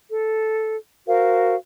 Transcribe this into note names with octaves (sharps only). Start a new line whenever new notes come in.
A4
F#4 A#4 C5 F5